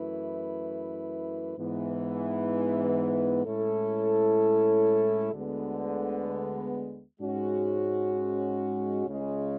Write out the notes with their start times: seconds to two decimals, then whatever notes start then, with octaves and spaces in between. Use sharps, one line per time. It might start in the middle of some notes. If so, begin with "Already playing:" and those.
Already playing: F#2 E3 A3 E4 B4
1.57 G#2 E3 B3
3.45 A2 G#3 C#4 E4 A4
5.32 D2 D3 G#3 B3
7.20 G#2 G#3 C#4 F#4
9.06 C#2 C#3 G#3